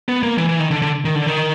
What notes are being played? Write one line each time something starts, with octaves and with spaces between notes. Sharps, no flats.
B3
A#3
E3
E3
D#3
D3
D3
D#3
D3
D#3